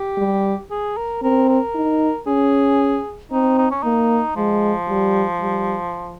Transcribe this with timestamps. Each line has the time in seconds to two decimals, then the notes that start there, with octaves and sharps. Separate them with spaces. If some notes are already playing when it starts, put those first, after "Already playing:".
Already playing: G4
0.18 G3
0.71 G#4
0.97 A#4
1.23 C4 A#4
1.49 A#4
1.75 D#4
2.27 C#4 G#4
3.32 C4 D#4
3.58 D#4
3.71 C#4
3.83 A#3 D#4
4.36 F3 G#3
4.89 G3
5.40 G3